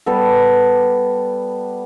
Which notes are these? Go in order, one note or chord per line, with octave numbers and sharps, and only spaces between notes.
G3 B3 A4